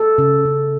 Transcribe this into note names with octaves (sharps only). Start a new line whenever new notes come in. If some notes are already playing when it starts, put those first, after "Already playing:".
Already playing: A4
C#3
C#3